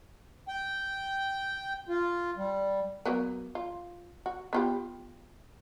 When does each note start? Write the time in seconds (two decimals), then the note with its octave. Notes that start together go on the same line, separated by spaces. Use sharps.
0.48 G5
1.89 F4
2.37 G3
3.05 F#3 A#3 B3
3.55 F4
4.26 F#4
4.53 B3 F4 G4